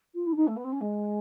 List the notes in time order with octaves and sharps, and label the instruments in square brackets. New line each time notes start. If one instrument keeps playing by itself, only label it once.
[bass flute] F4
E4
D4
D#4
A3
B3
C4
C#4
G#3